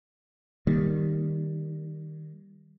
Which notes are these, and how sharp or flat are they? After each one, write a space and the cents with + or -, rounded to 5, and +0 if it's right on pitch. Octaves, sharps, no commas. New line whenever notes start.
D#3 +0 G3 +0 A#3 +0